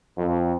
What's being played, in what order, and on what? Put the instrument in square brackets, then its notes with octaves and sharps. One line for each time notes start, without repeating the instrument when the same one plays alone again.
[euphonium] F2